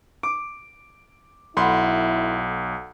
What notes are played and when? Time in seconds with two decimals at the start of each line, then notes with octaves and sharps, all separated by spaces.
0.23 D6 D7
1.57 B1 E4 A4 F#5 B5 C6